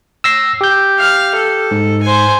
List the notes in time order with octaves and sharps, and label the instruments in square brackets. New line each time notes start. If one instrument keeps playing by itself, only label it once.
[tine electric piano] E6 A#6 C7
G4 G6
[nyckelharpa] F5
A4
[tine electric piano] G#2
[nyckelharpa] C5 G#5